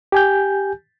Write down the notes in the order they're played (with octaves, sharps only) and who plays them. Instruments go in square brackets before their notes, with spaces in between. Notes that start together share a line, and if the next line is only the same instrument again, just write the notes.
[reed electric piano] G4 G#5 G6